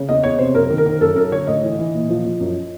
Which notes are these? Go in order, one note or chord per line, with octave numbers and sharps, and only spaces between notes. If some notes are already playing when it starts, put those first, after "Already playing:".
Already playing: C#3
E2 D#5
E2 C#5
C3 C5
F#2 A#4
D#3
A#4
D#3
F#2 A4
F#2 A#4
D3 C#5
A2 D#5
E3
E3
A#2
F3
F3
F#2